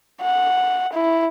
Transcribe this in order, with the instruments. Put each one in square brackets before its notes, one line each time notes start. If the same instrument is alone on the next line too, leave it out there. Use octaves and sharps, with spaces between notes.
[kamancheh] F#5
E4